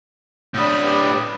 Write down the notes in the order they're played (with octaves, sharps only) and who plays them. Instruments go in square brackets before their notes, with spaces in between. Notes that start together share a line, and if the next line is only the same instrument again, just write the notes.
[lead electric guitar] A2 D4 [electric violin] B5 D#6
[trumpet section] G4 B4